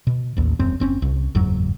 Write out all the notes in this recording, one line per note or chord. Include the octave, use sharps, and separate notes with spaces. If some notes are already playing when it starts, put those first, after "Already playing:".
B2
A1 D#2
E1 F#2 C4
F#1 C4 C#4
C2
F#1 E2 G#2 F#3